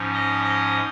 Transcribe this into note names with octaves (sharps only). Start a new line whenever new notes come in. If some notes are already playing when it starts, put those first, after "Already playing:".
Already playing: G#2 F3 C#4
D#5 D#6
D#5 D#6